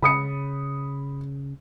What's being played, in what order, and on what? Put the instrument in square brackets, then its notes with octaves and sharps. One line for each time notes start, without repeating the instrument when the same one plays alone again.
[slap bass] C#3 [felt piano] B5 D#6 C#7